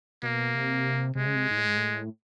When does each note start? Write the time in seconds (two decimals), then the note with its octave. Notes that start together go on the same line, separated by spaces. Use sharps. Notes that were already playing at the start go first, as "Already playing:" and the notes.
0.23 B2 A#3
0.54 C3
1.15 C3 G#3
1.26 C#3
1.35 C3
1.51 G#2
1.57 A2
1.67 G#2
1.77 A2